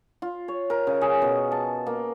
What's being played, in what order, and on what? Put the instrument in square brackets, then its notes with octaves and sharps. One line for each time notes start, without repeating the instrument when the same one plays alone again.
[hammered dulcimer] F4
C#5
A#4
C#3
G#4
B2
A5
A#3